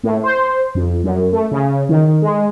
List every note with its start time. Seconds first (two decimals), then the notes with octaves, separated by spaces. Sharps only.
0.03 A2
0.24 C5
0.75 F2
1.04 F#2
1.32 A3
1.51 C#3
1.89 D#3
2.22 G#3